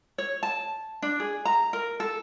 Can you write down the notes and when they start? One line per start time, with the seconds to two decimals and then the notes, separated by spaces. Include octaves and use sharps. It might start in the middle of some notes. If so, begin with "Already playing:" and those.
0.18 C#5
0.43 A5
1.02 D4
1.20 G#4
1.45 A#5
1.73 A#4
2.00 A4